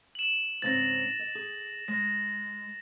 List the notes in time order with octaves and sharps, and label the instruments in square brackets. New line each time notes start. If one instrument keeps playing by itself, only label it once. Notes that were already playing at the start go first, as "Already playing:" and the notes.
[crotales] E7 F#7
[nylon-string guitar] G#2 C#3 C4 [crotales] A6 A#6
[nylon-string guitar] D#5
G#4
[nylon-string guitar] G#3 [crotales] A#6